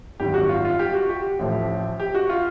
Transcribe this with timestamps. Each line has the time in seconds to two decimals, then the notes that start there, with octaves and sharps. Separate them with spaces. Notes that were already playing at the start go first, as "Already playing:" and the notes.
0.20 G#1 F#2 D#3 G3 G4
0.34 F#4
0.49 F4
0.65 F4
0.79 G4
0.94 F#4
1.09 G4
1.39 A1 A2 F3
2.00 G4
2.15 F#4
2.30 F4